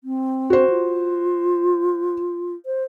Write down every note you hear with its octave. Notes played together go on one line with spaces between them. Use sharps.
C4
F#4 C5
F4
C5